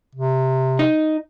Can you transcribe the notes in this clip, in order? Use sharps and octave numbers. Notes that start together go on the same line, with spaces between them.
C3
D#4